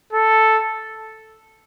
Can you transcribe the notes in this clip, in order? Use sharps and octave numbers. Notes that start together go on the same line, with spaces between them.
A4